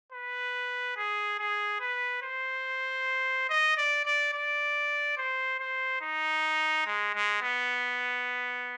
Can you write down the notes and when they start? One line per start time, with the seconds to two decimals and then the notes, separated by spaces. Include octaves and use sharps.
0.12 B4
0.97 G#4
1.39 G#4
1.80 B4
2.23 C5
3.50 D#5
3.77 D5
4.05 D5
4.34 D5
5.17 C5
5.60 C5
6.01 D#4
6.86 G#3
7.14 G#3
7.42 B3